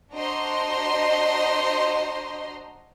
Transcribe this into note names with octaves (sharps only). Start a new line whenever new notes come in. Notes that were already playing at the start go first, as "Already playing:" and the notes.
D4 F#4 C5 D#5 A#5 C6